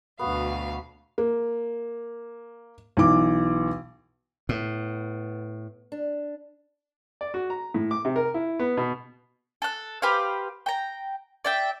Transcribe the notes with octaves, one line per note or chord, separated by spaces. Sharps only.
D2 B2 B3 F#4 F5
A#3
B1 E3 D6
A2 B3
D4
D5
F#4
A#5
A2
D6
C3
A#4
E4
B3
B2
A4 F#6
G4 B4 C5 F5
G5 A#5
D5 E5 G5